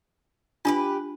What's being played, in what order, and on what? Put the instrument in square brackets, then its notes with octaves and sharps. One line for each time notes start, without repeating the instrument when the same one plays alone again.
[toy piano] D4 F4 [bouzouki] G4 G#4 B4